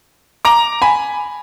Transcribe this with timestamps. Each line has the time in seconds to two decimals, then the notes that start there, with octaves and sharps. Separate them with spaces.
0.45 A#5 D6
0.82 G#5 B5